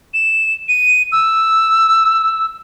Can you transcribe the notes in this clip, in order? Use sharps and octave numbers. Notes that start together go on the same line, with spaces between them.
E7
D#7
E6